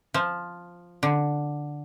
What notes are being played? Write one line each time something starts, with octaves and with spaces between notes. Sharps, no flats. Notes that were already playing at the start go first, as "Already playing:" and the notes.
F3
D3